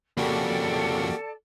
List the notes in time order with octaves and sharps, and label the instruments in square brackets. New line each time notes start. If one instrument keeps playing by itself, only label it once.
[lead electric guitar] F2 C#3 [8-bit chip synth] A#3 F#4 G4 [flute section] A4 D5 A5